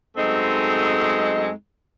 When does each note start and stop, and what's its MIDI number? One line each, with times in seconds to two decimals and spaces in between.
0.17 1.50 42
0.17 1.50 56
0.17 1.50 57
0.17 1.50 60
0.17 1.50 63